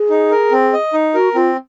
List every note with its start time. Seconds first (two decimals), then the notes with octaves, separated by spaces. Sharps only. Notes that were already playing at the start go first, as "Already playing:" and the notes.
Already playing: G#4
0.10 D#4
0.31 A#4
0.52 C4
0.73 D#5
0.93 D#4
1.14 F#4 A#4
1.35 C4 F4